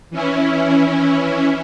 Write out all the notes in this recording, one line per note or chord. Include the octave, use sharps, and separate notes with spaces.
E3 C#4 E4